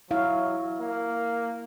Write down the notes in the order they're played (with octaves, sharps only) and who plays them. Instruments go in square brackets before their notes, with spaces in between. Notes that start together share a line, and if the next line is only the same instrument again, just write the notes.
[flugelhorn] F#3 [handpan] E4 F5
[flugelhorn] A#3